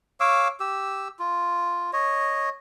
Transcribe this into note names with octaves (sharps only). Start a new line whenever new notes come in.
C#5 F5 D6 E6
G4 E6
F4
C#5 D#5